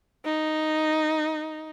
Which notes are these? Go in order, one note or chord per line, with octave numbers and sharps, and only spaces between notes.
D#4